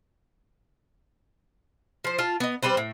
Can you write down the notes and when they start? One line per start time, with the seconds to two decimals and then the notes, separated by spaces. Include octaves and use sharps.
2.04 F3 C5
2.19 F4 A5
2.40 B3 D#5
2.63 G3 C4 B4 C5
2.77 A2